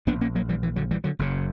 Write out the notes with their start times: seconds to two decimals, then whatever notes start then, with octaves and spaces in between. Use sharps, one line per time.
0.07 A#1 A#2 B3 D4
0.21 A#3 C#4
0.35 F#3 A#3
0.49 E3 G3
0.63 E3
0.76 D3 F#3
0.91 E3 G3
1.04 D3 F#3
1.19 F#1 F#2 C#3